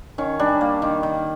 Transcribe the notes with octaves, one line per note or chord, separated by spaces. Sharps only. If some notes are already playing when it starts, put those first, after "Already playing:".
D#3 C#4
G3 D4
A#3
D#3
D#3